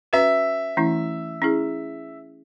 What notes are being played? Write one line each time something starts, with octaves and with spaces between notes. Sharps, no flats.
C#4 F#4 B4 E5
E3 A3 C#4 E4
C#4 E4 G#4